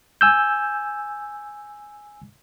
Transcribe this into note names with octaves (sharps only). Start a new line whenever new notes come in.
G#5 E6 G6